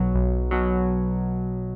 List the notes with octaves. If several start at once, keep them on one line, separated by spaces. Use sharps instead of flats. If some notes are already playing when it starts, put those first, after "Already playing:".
Already playing: B1 B2 F#3
B1
B2 F#3